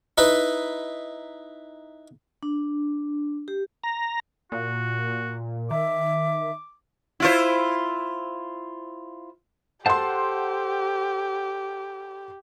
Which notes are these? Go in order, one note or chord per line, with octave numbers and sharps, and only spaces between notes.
D#4 E4 B4
D4
G4
A#5
A#2 F#4
D#3 E5 D6
E4 F4 C5
G4 A4 C5 F#5 A5 C6